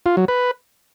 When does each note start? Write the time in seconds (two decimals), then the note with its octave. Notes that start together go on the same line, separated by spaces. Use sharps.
0.06 F4
0.17 F#3
0.28 B4